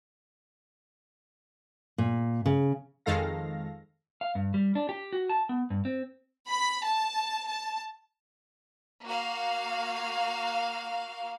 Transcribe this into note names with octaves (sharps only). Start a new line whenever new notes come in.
A#2
C#3
F2 D#3 G#3 A4 F5 A#6
F5
G2
G3
D4
G4
F#4
A5
B3
G2
C4
B5
A5
A5
A#3 F#4 F5